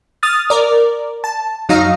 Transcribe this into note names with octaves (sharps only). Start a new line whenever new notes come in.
D#6 F6 A6
A#4 D5
A5
F#2 F#3 D#4 D#5 F5 A#5